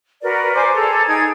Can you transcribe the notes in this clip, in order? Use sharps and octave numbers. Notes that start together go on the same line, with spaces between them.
F#4 A#4 B4 D5
C5 G#5 D6
G#4 A4 A#5
D#4 G#4 G5 G#6